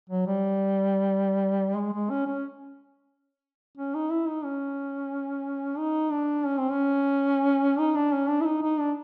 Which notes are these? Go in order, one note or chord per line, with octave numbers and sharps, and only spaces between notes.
F#3
G3
G#3
G#3
C#4
C#4
C#4
D#4
E4
D#4
C#4
D#4
D4
C#4
C4
C#4
D#4
D4
C#4
D4
E4
D#4
D#4
D4